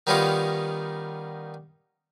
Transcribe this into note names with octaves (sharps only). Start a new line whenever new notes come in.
D#3 G3 B3 C#4 D#4 F4